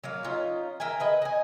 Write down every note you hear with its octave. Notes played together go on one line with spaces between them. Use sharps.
F#3 A#3 F5
C#4 D#4 F4
A#4 E5 G5 G#5
G#4 B4 D#5
D#5 G#5